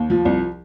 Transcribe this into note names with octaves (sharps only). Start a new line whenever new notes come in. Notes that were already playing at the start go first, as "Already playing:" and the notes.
Already playing: D#2
F3
C2